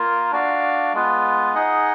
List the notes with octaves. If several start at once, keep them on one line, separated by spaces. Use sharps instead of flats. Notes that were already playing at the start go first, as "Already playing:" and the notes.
Already playing: A#3 F4 A#4
D4 F#4 D5 F5
G#3 B3 F4 B4
D#4 G#4 D#5 F#5